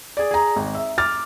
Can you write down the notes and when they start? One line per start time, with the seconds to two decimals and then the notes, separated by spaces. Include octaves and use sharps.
0.17 G#4 D5
0.31 G#4 A#5
0.56 G#1
0.75 E5
0.98 D6 F6 A6